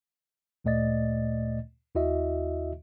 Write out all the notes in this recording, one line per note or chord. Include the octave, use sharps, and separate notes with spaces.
D2 A#2 A3 D5 D#5 A6
D#2 E4 F#4 D#5 E5